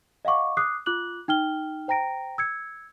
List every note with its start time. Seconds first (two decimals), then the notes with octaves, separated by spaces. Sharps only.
0.25 D#5 F5 F#5 C#6 D6
0.57 D6 D#6 F#6 C7
0.86 F4 D6 F#6 F#7
1.28 D#4 G5 F6 G7
1.88 C5 G5 A#5 A#6 D7
2.38 E6 G#6 C#7